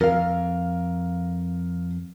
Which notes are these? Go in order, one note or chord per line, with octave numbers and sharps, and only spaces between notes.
F2 A#4 F5